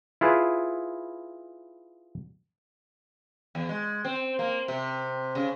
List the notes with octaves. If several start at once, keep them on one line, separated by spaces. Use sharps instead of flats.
E4 F4 G#4 B4
E2
G#3
C4
A#3
C3
C#3